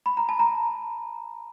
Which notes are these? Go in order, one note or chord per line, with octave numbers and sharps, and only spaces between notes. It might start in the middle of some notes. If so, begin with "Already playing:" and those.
B5
A#5
A5
A#5